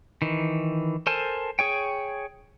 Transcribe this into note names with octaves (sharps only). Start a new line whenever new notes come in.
D#3 E3
A4 A#4 C5 G#5 A5
G#4 C#5 G5